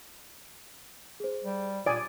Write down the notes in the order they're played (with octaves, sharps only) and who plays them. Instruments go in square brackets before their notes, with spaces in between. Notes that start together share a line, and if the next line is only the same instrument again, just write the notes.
[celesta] G#4 C5
[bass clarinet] G3
[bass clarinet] A#2 [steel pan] D5 G#5 [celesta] D#6 A6 D7